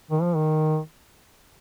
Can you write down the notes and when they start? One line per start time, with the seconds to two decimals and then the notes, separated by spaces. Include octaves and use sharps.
0.11 D#3
0.23 F3
0.36 D#3